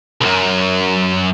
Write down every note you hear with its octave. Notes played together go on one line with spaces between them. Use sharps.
C2 F#2